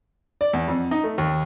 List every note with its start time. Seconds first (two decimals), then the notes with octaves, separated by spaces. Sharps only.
0.41 D5
0.53 E2
0.68 F2
0.91 D#4
1.04 A3
1.18 D#2